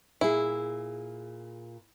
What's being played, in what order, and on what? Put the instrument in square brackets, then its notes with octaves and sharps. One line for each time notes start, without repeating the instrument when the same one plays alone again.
[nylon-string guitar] A#2 G#4 [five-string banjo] E4